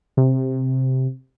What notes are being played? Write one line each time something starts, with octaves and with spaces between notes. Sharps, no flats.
C3